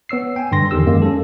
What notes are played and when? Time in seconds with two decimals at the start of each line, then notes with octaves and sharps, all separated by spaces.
0.09 B3 C#5 E6 C7
0.36 G5 G#5
0.52 G2 D3 C6 A#6
0.71 E2 D#3 G4 E6
0.86 F#2 G#3 A#3
1.02 C#4 A4